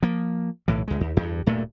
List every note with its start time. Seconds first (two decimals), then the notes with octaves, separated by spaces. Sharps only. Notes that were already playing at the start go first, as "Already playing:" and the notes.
0.03 F3 A#3
0.68 B1 A2 E3
0.88 C#2 G#3
1.01 D#2
1.17 E2 G2
1.46 D1 G2 A#2 A3